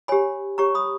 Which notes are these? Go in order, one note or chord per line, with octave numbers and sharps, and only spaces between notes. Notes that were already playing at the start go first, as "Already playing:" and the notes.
G4 C#5 G#5 B5
G4 C#5 A#5 C#6
B5 D#6